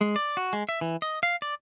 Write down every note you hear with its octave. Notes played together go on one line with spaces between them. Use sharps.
G#3
D5
F#4
G#3
E5
E3
D#5
F5
D5